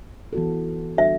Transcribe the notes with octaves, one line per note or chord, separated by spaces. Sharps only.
E3 B3 F#4 A4
D3 G3 D4 F#4 A4 E5